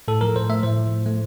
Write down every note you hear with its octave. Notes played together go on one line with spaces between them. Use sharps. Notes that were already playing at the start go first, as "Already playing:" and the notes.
A2 A4
F3 A#4
A2 C5
A3 E5
A2 C5
F3
A2
A3